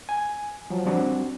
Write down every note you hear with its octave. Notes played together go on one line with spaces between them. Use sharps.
G#5
F3 F#3
G3 C4 D4 F#4